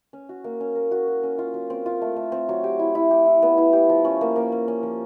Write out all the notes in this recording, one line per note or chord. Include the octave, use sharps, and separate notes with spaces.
C#4
F#4
A#3
C#4
A#4
F#4
F#4
C#4
F4
F#3
C4
F4
A3
A3
C4
F#3
G4
E4
E4
G4
E4
B3
E4
G4
F3
C#4
A#3
A#3
C#4
C#4
F3